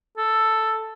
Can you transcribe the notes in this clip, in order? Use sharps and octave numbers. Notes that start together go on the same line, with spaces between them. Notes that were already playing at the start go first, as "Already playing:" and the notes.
A4